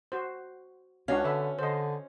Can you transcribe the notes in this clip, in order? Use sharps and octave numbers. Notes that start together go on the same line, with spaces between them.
F#4 C5
C#2 C#4 D4 F#4 F5
D3 B4 E5
D3 C5 D#5